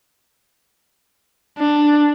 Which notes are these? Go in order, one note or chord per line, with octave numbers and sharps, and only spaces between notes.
D4